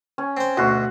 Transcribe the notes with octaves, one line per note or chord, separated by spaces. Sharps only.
C#4
C4 C5
D2 B2 F#4 C6